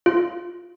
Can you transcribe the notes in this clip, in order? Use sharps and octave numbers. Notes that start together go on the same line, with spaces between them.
F4